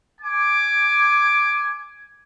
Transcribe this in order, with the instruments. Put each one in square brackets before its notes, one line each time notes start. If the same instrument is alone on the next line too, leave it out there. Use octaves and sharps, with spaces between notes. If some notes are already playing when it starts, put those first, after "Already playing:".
[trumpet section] G#5 D6